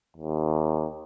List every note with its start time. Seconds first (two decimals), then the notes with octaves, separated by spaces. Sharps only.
0.17 D#2